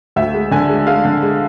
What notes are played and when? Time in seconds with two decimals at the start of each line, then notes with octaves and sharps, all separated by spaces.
0.16 D2 E5
0.34 G#3
0.51 D3 G#5
0.69 G#3
0.87 G#3 F5
1.05 D3
1.22 G#3